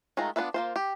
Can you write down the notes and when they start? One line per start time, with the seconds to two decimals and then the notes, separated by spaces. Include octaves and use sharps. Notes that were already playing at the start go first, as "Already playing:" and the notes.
0.17 D#3 G#3 A3 F4 A#5
0.36 B3 D4 F4 B4 E5
0.54 A#3 F4 C5
0.76 G4